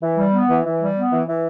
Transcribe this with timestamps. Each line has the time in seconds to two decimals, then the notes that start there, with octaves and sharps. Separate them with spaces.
0.02 E3
0.17 G3
0.33 B3
0.49 E3
0.64 E3
0.80 G3
0.95 B3
1.11 E3
1.27 E3